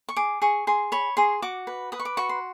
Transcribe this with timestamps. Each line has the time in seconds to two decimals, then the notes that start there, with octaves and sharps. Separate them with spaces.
0.09 C#6
0.16 G#4 D6
0.42 G#4 C#6
0.67 G#4 C6
0.92 C#5 B5
1.17 G#4 C6
1.42 F#4 D6
1.67 B4
1.92 B4 D#6
2.00 C#6
2.05 D6
2.17 F#4 C#6
2.29 C6